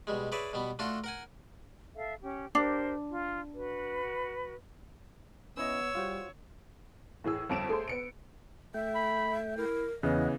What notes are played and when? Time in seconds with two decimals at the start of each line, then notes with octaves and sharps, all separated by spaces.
0.07 B2 G3 G#3
0.32 G#4 B4 C#5 D5 E5
0.53 B2 G3 B3
0.79 A3 D4 F4 F#4 A4
1.04 A#4 F#5 G#5
1.96 A4 E5 F5
2.23 C#4 G4
2.55 D4 G4 A#4 C5
3.09 F4
3.53 F#4 B4
5.57 B3 C#4 E4 C#5 D#5 E6
5.95 G3 F4 F#4 C5
7.24 A2 E3 G#4 E6
7.49 G1 F2 D7 E7
7.69 A3 G#4 A4 C5
7.88 B3 C#7 D7
8.74 A3 E5 G5
8.95 B5
9.57 E4 A#4
10.03 E2 C#3 E3 B3 E4 C#5 D#5 F#5